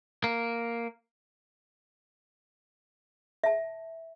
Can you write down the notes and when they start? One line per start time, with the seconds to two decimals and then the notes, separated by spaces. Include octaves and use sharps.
0.24 A#3
3.44 E5 A5